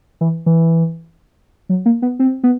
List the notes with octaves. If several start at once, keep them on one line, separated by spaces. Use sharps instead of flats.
E3
E3
F#3
A#3
B3
C4
B3